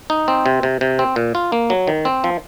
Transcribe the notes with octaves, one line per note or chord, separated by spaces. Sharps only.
D#4
C4
C3
C3
C3
C4
A#2
F4
A#3
F#3
D#3
C4
F3